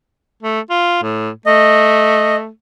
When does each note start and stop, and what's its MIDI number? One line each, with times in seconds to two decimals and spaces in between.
0.43 0.60 57
0.70 1.02 65
1.03 1.30 45
1.46 2.49 57
1.46 2.36 75